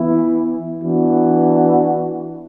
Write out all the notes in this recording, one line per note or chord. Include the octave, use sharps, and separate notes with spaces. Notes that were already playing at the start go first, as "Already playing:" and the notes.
Already playing: E3 B3 E4
E3 B3 D4 F#4